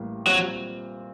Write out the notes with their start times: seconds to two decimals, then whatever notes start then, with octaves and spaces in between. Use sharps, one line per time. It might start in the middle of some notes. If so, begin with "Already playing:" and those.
Already playing: A1 A2 G3 A#3
0.27 A#2 F#3 G3 C4